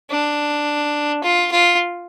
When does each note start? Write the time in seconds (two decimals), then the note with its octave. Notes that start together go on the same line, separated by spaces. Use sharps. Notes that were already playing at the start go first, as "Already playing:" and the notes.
0.11 D4
1.23 F4
1.51 F4